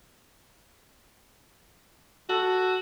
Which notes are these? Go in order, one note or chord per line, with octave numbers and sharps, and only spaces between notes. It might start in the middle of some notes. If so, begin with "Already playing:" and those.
F#4 A4